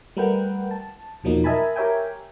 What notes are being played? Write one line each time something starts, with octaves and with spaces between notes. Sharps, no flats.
G3 A3 A#4 B4 F#5 G5
A5
E2 B2 F3 F#3 A#3 D#4
A#4 D#5 E5 G#5 A5 B5
G4 A#4 C#5 E5 G5 G#5